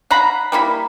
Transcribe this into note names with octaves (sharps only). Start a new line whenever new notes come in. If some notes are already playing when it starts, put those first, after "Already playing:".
F5 F#5 A#5 B5
G3 A#3 E4 B5